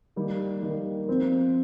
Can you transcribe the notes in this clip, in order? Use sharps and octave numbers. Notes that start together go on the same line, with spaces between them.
D#3 G3 A#3
D#3 G3 A#3
F3 C4 F4